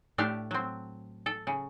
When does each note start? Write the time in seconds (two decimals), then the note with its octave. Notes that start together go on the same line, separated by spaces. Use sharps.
0.18 A2 A3 D4 G4 E5 F5
0.51 F#3 C4
1.26 A4
1.47 C#3